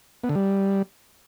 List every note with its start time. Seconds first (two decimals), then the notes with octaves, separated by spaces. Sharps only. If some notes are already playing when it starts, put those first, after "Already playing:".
0.24 B3
0.29 D3
0.35 G3